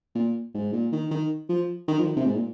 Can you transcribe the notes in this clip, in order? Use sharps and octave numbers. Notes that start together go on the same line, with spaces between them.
A#2
G#2
A#2
D#3
D#3
F3
D#3
F3
D#3
C3
G#2
A#2